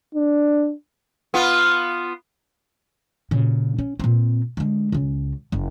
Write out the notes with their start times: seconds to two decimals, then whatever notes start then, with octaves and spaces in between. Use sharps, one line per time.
0.15 D4
1.34 B3 F4
3.31 A#2 C#3
3.79 C#4
4.00 A#2 C4
4.57 D3 G#3
4.92 C#2 C#3
5.52 F#1